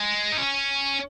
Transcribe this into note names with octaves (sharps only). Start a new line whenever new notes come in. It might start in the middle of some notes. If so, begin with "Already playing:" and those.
Already playing: G#3
D#4
C#4